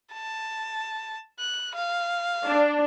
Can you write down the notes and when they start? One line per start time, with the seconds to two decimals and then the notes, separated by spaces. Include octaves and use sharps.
0.13 A5
1.39 F#6
1.75 F5
2.46 D4